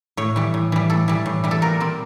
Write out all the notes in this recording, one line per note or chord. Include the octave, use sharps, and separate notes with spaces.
A2 C#5
E3 G3
A2
E3 G3
A2 A4
E3 G3
A2
E3 G3
A4
A#2 A#4
G3 C4